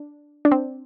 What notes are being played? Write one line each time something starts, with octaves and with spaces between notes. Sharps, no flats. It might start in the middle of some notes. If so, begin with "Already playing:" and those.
Already playing: D4
D4
C4